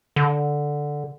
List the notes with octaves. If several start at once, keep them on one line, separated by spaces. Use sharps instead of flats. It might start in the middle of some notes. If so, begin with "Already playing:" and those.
D3